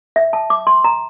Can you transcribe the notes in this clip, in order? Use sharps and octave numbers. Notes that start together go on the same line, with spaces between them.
E5
A5
D6
C6
A#5